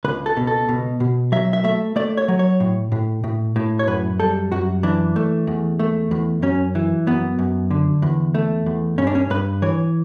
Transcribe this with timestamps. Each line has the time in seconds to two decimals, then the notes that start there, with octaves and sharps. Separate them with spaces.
0.04 C#2 B4
0.26 A4
0.37 B2
0.47 A4
0.69 B2
1.00 B2
1.32 F#3 E5
1.53 E5
1.64 A3 E5
1.96 A3 D5
2.17 C#5
2.28 F#3
2.39 C#5
2.60 A2
2.92 A2
3.24 A2
3.56 A2
3.79 C#5
3.87 F#2 B4
4.20 G3 A4
4.52 F#2 F#4
4.83 E3 D4
5.16 A3
5.47 E2
5.79 A3
6.11 E2
6.42 F#2 C#4
6.75 E3
7.07 F#2 B3
7.39 F#2
7.71 D3
8.02 E2
8.34 A3
8.66 E2
8.98 G2 C#4
9.07 D4
9.15 C#4
9.30 G2 B4
9.62 E3 C#5